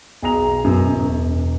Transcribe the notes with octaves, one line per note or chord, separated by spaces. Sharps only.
B1 G#4 A#5 F7
F#2 B2
E1